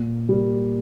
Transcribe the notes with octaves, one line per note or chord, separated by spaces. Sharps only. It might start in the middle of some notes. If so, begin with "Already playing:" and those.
Already playing: A#2
G3 A#3